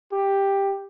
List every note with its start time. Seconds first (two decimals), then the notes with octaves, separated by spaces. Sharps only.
0.12 G4